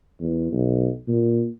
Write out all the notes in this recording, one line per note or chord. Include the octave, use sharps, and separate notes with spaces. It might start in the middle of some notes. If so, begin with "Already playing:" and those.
E2
B1
A#2